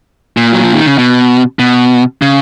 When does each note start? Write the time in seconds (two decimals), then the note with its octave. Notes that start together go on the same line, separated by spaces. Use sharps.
0.37 A#2
0.52 F#3
0.64 F3
0.74 D#3
0.86 C#3
0.98 B2
1.59 B2
2.22 C#3